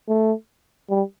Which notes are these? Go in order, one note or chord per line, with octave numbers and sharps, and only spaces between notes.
A3
G3